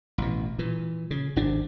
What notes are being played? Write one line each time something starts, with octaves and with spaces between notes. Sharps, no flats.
A1 B2
A#2 E3
C#3
G#1 C3 D4